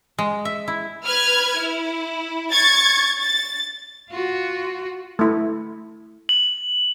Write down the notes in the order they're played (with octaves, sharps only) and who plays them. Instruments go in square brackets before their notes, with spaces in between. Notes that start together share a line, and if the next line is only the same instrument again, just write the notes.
[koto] G#3
E5
E4
[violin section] B4 F6 G#6
E4
C#6 G#6 A6
A6
[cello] F4 F#4
[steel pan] A3 E4
[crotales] F#7